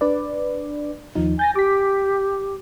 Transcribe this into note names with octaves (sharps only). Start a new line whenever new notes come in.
D4 B4 D5
D#2 F3 D#4
G#5 G6 A6 A#6
G4 D6 B6